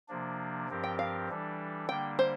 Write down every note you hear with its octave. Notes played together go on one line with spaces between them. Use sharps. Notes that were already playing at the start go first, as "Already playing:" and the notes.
C3 F3 A#3 D4
G2 F3 C4 G4 A#4
G5
F5
E3 G3 D4 A4
D3 G3 A#3 D4 G5
C5